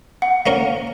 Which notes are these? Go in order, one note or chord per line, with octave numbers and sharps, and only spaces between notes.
F#5
A#3 C#4 A#4